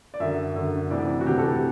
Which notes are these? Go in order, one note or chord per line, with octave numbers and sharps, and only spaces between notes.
D5
F#2 D3 E5
F#2 D3
D2 C3 E3 D5
F#4
D2 C3 E3 G4
A4
G4